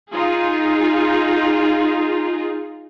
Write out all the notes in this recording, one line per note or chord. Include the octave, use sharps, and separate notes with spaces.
D#4 F4 G#4